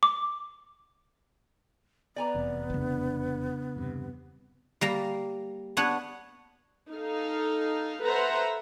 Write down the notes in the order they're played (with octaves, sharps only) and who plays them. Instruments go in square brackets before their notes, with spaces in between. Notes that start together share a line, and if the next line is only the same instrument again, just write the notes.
[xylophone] D6
[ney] B3 [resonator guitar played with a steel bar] D5 G#5 A#5
[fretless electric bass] F1 E2 C3
[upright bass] C#3 D4
[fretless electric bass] E2 G2 C3
[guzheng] G3 A#3 A#5
B3 D4 C#5 F#5
[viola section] D#4 A4 F5
A4 B4 C5 E5 F#5 A#5